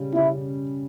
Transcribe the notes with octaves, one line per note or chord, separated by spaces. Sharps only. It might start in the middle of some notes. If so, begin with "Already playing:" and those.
Already playing: C#3 G3
C#3 E4